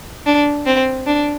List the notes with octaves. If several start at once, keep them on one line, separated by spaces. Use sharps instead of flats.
D4
C4
D4